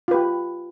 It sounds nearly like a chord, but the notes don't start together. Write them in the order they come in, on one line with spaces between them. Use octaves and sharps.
F4 B4 G4